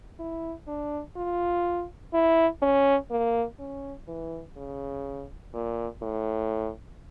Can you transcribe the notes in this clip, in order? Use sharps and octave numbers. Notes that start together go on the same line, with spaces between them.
E4
D4
F4
E4
C#4
A#3
C#4
E3
C#3
A#2
A2